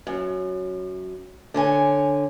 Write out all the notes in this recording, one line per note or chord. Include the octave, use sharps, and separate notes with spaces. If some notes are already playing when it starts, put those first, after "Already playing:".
F#2
D3 C#5 G#5